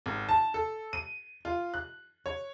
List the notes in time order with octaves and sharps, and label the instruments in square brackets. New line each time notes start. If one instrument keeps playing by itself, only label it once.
[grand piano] G#1
A5
A4
D#7
F4
F#6
C#5